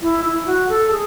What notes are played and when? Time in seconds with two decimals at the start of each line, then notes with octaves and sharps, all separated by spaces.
0.02 E4
0.25 E4
0.46 F#4
0.69 A4
0.91 G#4